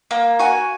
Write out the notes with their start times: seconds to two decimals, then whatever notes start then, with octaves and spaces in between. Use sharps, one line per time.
0.11 A#3
0.39 F#4 G#5